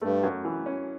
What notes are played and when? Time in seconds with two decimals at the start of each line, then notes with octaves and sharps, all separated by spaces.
0.02 G2 A3
0.23 F#2
0.45 E3
0.66 C#4